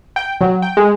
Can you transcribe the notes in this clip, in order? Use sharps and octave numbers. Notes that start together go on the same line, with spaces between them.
G5
F#3
G5
G#3